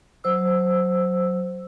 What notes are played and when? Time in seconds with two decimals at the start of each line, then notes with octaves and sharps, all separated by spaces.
0.24 F#3 C5 E6